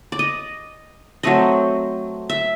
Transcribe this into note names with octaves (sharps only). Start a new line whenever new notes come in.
D5
D#5
F#3 A3 C4 D#5
E5